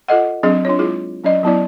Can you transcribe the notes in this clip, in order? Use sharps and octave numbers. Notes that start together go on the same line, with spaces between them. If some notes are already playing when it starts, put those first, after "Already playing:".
F4 A4 D#5 F#5
F#3 C4 D4 G#4 D#5
D4 F4 C#5
G#3 E4 F4 G#4
F#3 C#4 D5 D#5
F#3 B3 E4 D5